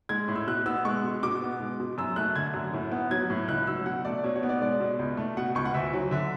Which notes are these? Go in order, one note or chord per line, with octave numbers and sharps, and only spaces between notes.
G#3 G#6
A2
E6
B2 F#6
B3 E6
G#3 C#6
B2
B2 D6
B3
G#3
B2
F#2 E6
A3 F#6
D3 G#6
F#2
A2
B3
F#3 G#6
A2
C#2 F#6
F#3 E6
B2 F#5
A3 D5
B2 C#5
C#5
B3
D5
G#3 D5
B2
C#2
A3
B2 F#5
C#2 C#6
F#5
D2 E5
F#3
D3 E5